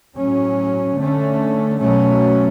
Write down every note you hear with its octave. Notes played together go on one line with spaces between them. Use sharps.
A2 F#3 C#4
D3 A3 C#4
B2 F#3 A3 C#4